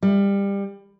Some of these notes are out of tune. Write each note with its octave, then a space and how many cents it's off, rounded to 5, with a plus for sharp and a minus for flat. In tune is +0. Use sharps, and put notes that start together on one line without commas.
G3 +25